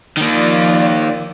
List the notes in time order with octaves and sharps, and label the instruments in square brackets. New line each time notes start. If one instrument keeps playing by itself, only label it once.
[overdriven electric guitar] D#3 A#3 [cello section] F3 F4 D5